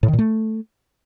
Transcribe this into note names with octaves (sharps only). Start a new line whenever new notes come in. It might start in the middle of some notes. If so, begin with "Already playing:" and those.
A2
D#3
A#2
A3